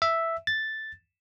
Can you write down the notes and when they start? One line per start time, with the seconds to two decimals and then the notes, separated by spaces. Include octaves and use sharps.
0.02 E5
0.47 A6